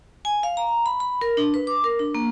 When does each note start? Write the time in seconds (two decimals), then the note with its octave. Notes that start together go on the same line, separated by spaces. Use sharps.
0.25 G#5
0.43 F5
0.57 A#5
0.86 B5
1.00 B5
1.21 A#4
1.37 D4
1.54 B4
1.67 D6
1.84 A#4
1.99 D4
2.15 A#3